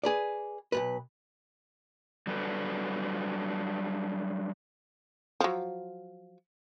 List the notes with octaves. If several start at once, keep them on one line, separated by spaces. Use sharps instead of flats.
G#4 B4 D5
B1 E2 B4
F#3 G3 D4 A4 B4
F3 F#3